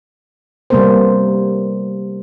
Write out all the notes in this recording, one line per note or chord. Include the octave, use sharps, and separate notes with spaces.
C3 G3 A#3 B3 A#4 C5